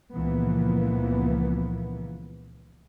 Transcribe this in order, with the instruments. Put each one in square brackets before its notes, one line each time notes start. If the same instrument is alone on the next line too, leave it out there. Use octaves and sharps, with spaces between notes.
[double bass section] C#2 A#2 E3 F3 A#3 B3